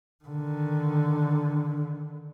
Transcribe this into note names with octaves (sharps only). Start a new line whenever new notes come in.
D3 D#3